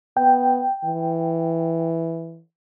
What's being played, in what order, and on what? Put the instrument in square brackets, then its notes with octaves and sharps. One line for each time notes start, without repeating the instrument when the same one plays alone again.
[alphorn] B3 [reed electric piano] G5
[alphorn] E3